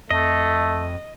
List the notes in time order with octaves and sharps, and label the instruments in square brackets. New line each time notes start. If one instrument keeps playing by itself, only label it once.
[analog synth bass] F2 [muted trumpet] A3 [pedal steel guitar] D#5